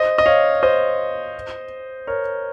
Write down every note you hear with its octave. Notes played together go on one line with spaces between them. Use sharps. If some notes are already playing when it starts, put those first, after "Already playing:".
Already playing: C5 D#5
D#5
C#5 F5
C5 D#5
A#4 C#5